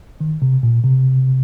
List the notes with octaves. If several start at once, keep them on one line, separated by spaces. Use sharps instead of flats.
D#3
C3
A#2
C3